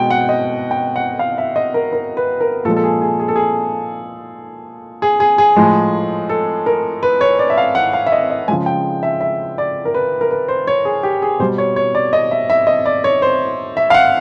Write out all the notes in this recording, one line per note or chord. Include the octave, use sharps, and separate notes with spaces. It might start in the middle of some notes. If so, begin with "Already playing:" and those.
Already playing: B2 G#3 G5
F#5
D#5
G5
F#5
F5
E5
D#5
A#4
A#4
B4
A#4
A#2 F3 G#3 A4
A4
G#4
G#4
G#4
A4
G#4
G#4
G#4
G#4
A2 F3 G#3
A4
A#4
B4
C#5
D5
E5
F5
F#5
F5
E5
D#5
D#5
C#3 F3 G#3 G#5
G5
E5
E5
D5
A#4
B4
A#4
B4
C5
C#5
G#4
G4
G#4
B2 G3 C5
C#5
C#5
D5
D#5
E5
E5
D#5
D5
C#5
C5
E5
F5
F#5